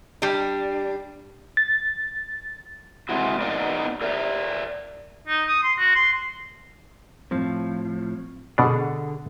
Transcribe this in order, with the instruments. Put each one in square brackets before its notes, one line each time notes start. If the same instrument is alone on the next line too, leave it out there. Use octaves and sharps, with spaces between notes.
[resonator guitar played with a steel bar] G3 D4
[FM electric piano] A6
[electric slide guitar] G#3 C4 E4 F#4
B3 D#4 A#4 D5 D#5 F5
A#4 D5 E5
[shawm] D#4
D#6
C6
F#4
C6
[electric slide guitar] A2 F3 [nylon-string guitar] C4
[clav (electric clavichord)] B2 D4 [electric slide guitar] D3 [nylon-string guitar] G#4 A4 F#5